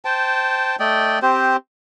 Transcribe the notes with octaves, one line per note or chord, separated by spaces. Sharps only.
C5 G5 A5
A3 D5 D#5 G5
C4 G4 C5